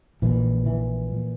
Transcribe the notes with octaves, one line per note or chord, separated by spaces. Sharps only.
A#1 A#2 E3
E3
A#2